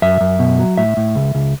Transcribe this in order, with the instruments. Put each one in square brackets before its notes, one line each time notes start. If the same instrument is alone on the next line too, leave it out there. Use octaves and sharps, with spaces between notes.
[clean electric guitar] F#2 E5
F#2
B2
F#3
A2 E5
A2
C#2
C#2